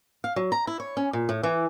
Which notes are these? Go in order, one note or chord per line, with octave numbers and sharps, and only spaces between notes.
F5
F#3
A#5
E4
C#5
C#4
A#2
A2
E3